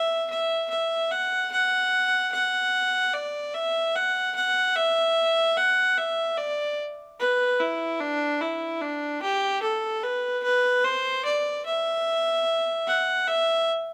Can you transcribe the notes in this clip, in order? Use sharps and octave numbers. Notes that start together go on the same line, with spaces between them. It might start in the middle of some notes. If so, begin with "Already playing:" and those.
Already playing: E5
E5
E5
F#5
F#5
F#5
D5
E5
F#5
F#5
E5
F#5
E5
D5
B4
E4
D4
E4
D4
G4
A4
B4
B4
C5
D5
E5
F#5
E5